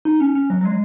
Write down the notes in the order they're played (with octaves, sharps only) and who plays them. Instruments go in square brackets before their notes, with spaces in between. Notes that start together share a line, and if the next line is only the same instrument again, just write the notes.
[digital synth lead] D#4
C#4
C#4
F#3
F#3
G#3